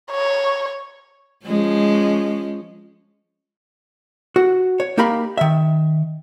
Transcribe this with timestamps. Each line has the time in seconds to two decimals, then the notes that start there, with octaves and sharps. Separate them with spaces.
0.11 C#5
1.46 F3 G#3 C#4
4.36 F#4
4.80 C#5
4.97 A#3 D#4 G4 A#4 F5 B5
5.38 D#3 E5